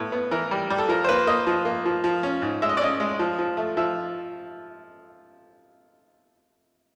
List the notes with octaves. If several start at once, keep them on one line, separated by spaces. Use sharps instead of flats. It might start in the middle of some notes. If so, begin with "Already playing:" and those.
Already playing: A2 B3
B3
E3 A#4
G3
G3
A4
F3 A#4
C5
A#3 B4
A#3 D#5
F3
A#3
F3
F3
C#4
G#2
G#3 E5
D#5
D5
C#4 D#5
G#3
F3
F3
A3
F3 E5